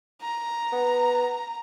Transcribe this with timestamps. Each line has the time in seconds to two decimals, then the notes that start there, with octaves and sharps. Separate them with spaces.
0.22 A#5
0.72 B3